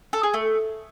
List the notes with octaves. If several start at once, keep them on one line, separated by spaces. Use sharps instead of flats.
A4
G#4
A3